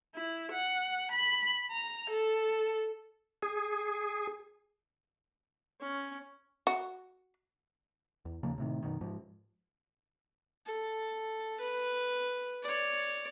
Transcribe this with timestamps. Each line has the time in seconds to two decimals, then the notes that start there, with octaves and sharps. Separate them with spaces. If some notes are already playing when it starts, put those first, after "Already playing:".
0.15 E4
0.52 F#5
1.12 B5
1.72 A#5
2.10 A4
3.42 G#4
5.81 C#4
6.67 F#4
8.25 E2
8.43 D#2 C#3 F3 A#3
8.58 A2 C3 D#3
8.83 F#2 B2 D#3
9.01 G#2 F3
10.66 A4
11.60 B4
12.63 C#5 D5